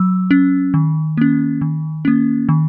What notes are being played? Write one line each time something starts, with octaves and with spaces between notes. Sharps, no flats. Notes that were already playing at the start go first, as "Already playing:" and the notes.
Already playing: F#3 E6
C#4
D#3
A#3 C#4
D#3
A#3 C#4
D#3